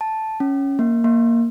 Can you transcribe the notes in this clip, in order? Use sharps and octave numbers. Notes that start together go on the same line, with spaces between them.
A5
C#4
A#3
A#3